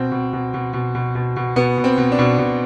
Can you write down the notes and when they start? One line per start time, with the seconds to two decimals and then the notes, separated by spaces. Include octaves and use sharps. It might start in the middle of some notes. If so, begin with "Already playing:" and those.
Already playing: B2 C4
0.12 B2
0.33 B2
0.54 B2
0.73 B2
0.95 B2
1.15 B2
1.36 B2
1.56 B2 B3
1.78 B2
1.84 C4
1.97 B2
2.12 D4
2.19 B2
2.39 B2